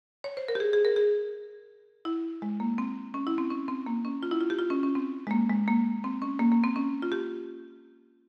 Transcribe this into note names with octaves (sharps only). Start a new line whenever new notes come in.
C#5
C5
A#4
G4
G#4
G#4
A#4
G#4
E4
G#3
A#3
C4
C#4
E4
C4
C#4
C4
A#3
C#4
F4
E4
F4
G4
F4
C#4
C#4
C4
G#3
A#3
G#3
A#3
C4
C#4
A#3
A#3
C4
C#4
F4
G4